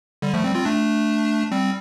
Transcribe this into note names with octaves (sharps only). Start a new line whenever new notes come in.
D3 G3
F3 A3
G3 C4
C4 F4
A3 D4
G3 C4